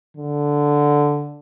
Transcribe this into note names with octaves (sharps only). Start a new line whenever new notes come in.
D3